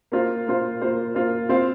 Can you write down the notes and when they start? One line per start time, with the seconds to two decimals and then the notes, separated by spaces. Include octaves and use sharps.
0.12 A#3 F4 C5
0.47 A#3 F4 C5
0.82 A#3 F4 C5
1.15 A#3 F4 C5
1.49 C4 F4 C5 F5